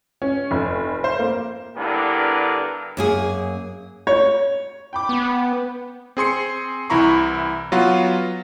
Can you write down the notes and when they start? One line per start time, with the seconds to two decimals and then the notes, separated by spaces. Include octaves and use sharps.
0.22 C#4
0.51 F1
1.04 C5
1.19 A#3
1.77 G2 D3 B3 E4 G4 A#4
2.97 F#2 A#3 G#4
4.07 C#5
4.93 G5 B5 D6
5.09 B3
6.17 C4 G#4 C6 C#7
6.90 C2 E3 E4 A#5 B5 C#6
7.72 F#3 B3 F4 F#4